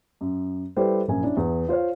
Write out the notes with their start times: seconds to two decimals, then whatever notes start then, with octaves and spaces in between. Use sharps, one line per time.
0.21 F#2
0.76 G3 E4 G4 A4 B4 C5
1.08 A#1 F#2 A#3 G#5
1.23 C#4 D4 E4
1.37 E2
1.69 F4 C5 C#5 F5